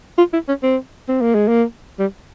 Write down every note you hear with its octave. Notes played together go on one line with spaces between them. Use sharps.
F4
E4
C#4
C4
C4
A#3
G#3
A#3
G3